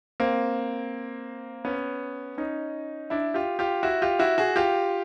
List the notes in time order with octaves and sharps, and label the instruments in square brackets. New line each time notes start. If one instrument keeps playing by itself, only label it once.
[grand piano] A#3 C4
B3 C#4
C#4 D#4
D4 E4
F4 G4
F4 G4
E4 F#4
F4 G4
E4 F#4
F#4 G#4
F4 G4